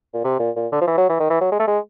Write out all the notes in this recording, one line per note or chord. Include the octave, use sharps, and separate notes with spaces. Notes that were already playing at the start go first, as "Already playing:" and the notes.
A#2
C3
A#2
A#2
D3
F3
E3
F#3
E3
D#3
E3
F#3
G#3
A3
G#3